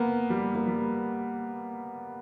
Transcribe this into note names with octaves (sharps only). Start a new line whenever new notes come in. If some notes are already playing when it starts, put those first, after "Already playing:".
Already playing: A#3 B3
G3
A#3
G3